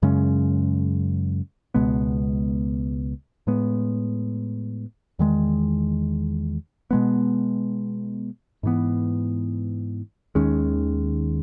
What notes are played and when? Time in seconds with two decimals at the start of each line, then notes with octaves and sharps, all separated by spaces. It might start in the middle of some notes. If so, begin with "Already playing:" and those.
0.02 F#2 C#3 G#3 C#4
1.74 C#2 B2 G#3 B3
3.47 A2 G#3 B3
5.19 E2 D#3 G#3
6.91 B2 G#3 B3
8.63 G#2 E3 B3
10.35 D#2 D#3 G#3 C#4